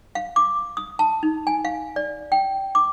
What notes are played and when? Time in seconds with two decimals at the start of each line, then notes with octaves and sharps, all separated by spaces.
0.15 F5
0.36 D6
0.77 D#6
0.99 A5
1.23 D#4
1.47 G#5
1.65 F5
1.96 D5
2.32 G5
2.75 D6